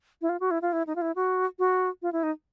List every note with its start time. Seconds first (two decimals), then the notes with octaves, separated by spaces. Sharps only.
0.22 E4
0.29 F4
0.40 F#4
0.51 E4
0.62 F4
0.73 E4
0.87 D#4
0.96 F4
1.02 E4
1.16 F#4
1.59 F#4
2.02 F4
2.13 E4
2.23 D#4